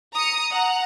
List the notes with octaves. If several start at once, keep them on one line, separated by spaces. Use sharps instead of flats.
A#5 D#6 C#7
F#5 A#5